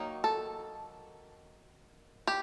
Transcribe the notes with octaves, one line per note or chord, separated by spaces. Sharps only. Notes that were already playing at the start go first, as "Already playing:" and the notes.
Already playing: D#3 F#3 A#3 D#4
A4
G4